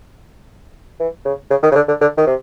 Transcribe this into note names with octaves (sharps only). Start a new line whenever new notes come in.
E3
C#3
C#3
D#3
C#3
D3
D3
D3
D#3
C3